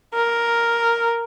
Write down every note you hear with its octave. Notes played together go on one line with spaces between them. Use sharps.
A#4